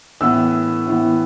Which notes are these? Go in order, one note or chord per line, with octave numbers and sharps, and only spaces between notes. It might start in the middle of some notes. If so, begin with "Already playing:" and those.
A2 E3 B3 E6
A2 E3 B3